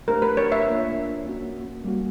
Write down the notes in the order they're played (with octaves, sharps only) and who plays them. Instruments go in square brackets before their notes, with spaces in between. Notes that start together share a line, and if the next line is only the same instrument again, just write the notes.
[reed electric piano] A3 D4 G4 C5 [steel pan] A#4
[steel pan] B4
C#5
E5
[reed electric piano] A#3 D4 F4 A#4 C#5
A#3 C#4 F#4
G3 A#3 C#4 F#4